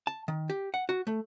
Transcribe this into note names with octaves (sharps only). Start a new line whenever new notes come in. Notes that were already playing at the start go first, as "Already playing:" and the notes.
A5
D#3
G4
F#5
F#4
A3